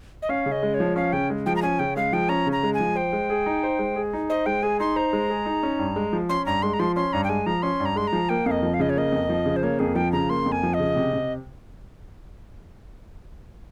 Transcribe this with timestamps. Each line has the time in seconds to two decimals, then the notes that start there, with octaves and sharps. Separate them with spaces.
0.22 D#5
0.29 C#4 F5
0.46 C#3
0.52 D#5
0.63 G#3
0.74 C#5
0.80 F3
0.96 C#4 F5
1.13 C#3 G5
1.30 G#3
1.46 F3 G5
1.56 A#5
1.62 C#4 G#5
1.79 C#3 G5
1.96 G#3 F5
2.13 F3 G5
2.29 C#4 A#5
2.47 C#3
2.52 A#5
2.63 G#3
2.74 G#5
2.80 F3
2.96 C5 G5
3.13 G#3
3.30 G#4
3.46 D#4
3.63 C5
3.79 G#3
3.96 G#4
4.13 D#4
4.30 C5 D#5
4.46 G#3 G5
4.63 G#4 G#5
4.80 D#4 C6
4.96 C5 A#5
5.13 G#3
5.30 G#4
5.46 D#4
5.63 C#4
5.79 G2
5.96 G#3
6.13 F3
6.29 C#4 C6
6.46 G2 A#5
6.62 G#3 C6
6.73 A#5
6.80 F3 C6
6.96 C#4 C6
7.13 G2 A#5
7.24 G5
7.29 G#3 G#5
7.46 F3 A#5
7.62 C#4 C6
7.80 G2
7.85 A#5
7.96 G#3 C6
8.07 A#5
8.13 F3
8.29 A#3 G5
8.46 F2 F5
8.51 D#5
8.63 F3
8.74 F5
8.80 C#3 D#5
8.89 C#5
8.96 A#3 D#5
9.12 F2
9.30 F3
9.46 C#3
9.56 C5
9.63 A#3 C#5
9.79 F2 G#4
9.96 F3 G5
10.12 C#3 A#5
10.30 A#3 C6
10.46 F2
10.52 G#5
10.63 F3
10.74 D#5
10.80 C#3
10.96 C3
11.13 C3